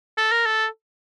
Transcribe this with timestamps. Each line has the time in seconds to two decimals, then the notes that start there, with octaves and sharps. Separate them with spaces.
0.18 A4
0.32 A#4
0.46 A4